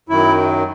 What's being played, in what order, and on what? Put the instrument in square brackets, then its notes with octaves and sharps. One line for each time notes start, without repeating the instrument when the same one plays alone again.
[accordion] F#2 D#3 F#3 E4